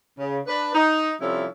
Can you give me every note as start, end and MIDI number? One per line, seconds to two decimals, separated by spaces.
0.19 0.39 49
0.47 0.73 62
0.47 0.73 71
0.75 1.14 63
1.21 1.46 48
1.21 1.46 53
1.21 1.46 55
1.21 1.46 61
1.21 1.46 64
1.21 1.46 69